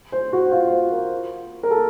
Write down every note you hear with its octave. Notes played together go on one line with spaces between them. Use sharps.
C5
F#4
F4
C5
A#4
A#4
A4